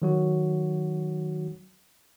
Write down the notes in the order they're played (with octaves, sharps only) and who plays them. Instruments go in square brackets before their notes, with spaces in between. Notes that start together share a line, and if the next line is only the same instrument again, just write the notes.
[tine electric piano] D#3 F#3 F#4